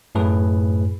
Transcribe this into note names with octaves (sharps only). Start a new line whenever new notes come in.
F#2 A2 G#4 B4